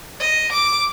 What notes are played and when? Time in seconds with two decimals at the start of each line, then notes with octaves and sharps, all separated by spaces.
0.20 D#5
0.52 D6